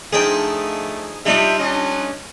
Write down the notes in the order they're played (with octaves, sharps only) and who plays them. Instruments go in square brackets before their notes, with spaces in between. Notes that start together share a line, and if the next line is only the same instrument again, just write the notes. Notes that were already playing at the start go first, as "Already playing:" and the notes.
[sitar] F3 D4 D#4 [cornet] A3 [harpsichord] G#4 D#5 G5
[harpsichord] G3 D#4 F4 [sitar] D4 G4 [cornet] E5
[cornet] C#4 [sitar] D4 D#5